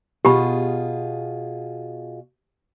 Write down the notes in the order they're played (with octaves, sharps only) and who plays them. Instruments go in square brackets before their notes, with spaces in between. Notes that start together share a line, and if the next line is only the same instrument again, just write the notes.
[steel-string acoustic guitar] B2 F4 G#4 [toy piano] G4 B5